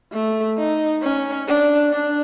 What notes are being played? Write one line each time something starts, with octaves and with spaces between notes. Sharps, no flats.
A3
D#4
C#4
D4
D4